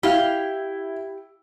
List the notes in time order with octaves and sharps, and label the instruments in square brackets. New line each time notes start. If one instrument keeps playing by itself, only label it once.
[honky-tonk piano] E4 [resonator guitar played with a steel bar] G4 F5